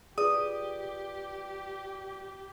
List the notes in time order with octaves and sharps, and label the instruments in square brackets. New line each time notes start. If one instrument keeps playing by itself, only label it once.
[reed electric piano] F4 B4 D5 [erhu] G4 [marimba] G#4 [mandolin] D#6